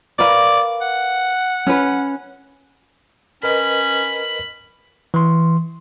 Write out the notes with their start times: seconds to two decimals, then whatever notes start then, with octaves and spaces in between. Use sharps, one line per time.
0.19 A#4 B4 D5 F5
0.81 F#5
1.67 C#4 B4
3.43 C#4 A#4 B4 D#5 B5
5.14 E3 C6